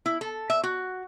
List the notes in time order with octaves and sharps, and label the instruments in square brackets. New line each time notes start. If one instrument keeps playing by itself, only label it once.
[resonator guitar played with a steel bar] E4
A4
E5
F#4